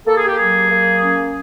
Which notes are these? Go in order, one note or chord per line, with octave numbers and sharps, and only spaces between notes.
A#3 A4
G#4
G4
F#3 G#4
A#3
C#4